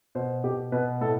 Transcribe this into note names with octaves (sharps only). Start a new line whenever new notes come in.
B2 C5
B2 G4
B2 B4
A2 A4